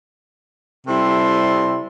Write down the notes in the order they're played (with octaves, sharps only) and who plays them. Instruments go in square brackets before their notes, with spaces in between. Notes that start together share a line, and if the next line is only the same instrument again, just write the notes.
[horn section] C3 G3 C4 E4 A4 C6